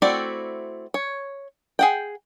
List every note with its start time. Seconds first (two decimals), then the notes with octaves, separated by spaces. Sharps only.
0.02 A3 C4 E4 F#4 D5
0.94 C#5
1.79 G#4 F#5 G5